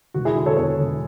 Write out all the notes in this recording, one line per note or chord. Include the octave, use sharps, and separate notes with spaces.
E1 F#4
E4 G#4
D3
A4 C#5
E2 A4 C#5
E1